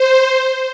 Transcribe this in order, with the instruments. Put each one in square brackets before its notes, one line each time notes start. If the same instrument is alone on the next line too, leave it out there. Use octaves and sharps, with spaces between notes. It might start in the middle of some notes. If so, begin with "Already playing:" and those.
Already playing: [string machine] C5